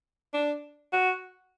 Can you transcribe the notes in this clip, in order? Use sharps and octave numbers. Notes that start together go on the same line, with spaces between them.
D4
F#4